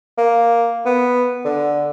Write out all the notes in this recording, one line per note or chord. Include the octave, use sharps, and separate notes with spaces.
A#3
B3
D3